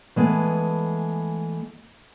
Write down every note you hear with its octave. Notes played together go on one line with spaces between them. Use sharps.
E3 G#3 A3 B3